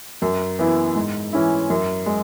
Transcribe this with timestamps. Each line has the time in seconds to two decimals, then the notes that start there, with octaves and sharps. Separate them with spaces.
0.22 F#2
0.59 E3 B3 E4
0.95 G#2
1.33 E3 C#4 E4
1.70 F#2
2.06 G#3